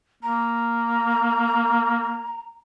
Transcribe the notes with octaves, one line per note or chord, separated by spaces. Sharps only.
A#3 A#5